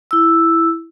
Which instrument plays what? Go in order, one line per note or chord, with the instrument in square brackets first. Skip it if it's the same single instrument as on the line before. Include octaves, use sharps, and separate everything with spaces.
[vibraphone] E4 E6